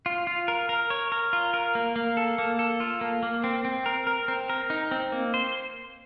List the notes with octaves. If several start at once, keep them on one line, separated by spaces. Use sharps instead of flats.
F4
F4
A#4
A#4
C#5
A#4
F4
A#4
A#3
A#3
A4
A#3
A4
F4
A#3
A#3
C4
C4
A#4
A#4
C4
A#4
D#4
C4
A#3
C5